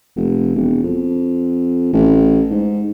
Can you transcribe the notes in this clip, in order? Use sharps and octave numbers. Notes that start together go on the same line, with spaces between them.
F1
E1
F2
A1
G#2